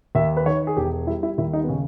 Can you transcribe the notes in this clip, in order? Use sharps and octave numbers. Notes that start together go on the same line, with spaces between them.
D#2 E5
B4
D#3 C#5
G#4
E1 G4
G3 E4
E4
D#2 E4
D#4
B3
C#3 C#4